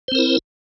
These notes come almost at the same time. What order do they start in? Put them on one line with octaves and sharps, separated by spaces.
C5 C4 A#4 E4